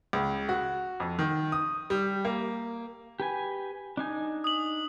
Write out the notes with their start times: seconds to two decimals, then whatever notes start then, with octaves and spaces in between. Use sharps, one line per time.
0.13 C#2
0.49 F#4
1.00 F2
1.19 D#3
1.52 D#6
1.90 G3
2.25 A#3
3.20 G4 B4 G#5
3.97 D4 D#4 G#5
4.44 D#6 F#7